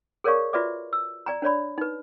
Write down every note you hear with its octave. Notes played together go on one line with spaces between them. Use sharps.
G#4 A#4 C#5 D5 F5 C#6
F4 F#4 B4 D5 E5 D6
E6
D5 G#5 A#5
D4 C#5 D5 B5
D#4 B4